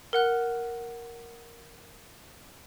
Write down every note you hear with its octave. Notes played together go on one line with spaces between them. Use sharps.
A#4 F#5 F#6